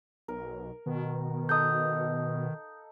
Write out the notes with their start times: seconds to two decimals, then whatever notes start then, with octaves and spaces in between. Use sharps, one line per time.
0.28 B1 A#4
0.86 B2 D#3
1.49 D#4 A4 F5 D#6 G6